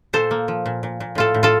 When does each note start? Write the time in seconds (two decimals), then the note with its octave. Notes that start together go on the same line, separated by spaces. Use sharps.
0.13 A#2 A4 C5
0.31 A#3
0.48 F3
0.66 A#2
0.83 A#2
1.00 A#2
1.15 A2 F4 A4
1.34 A2
1.43 F4 A4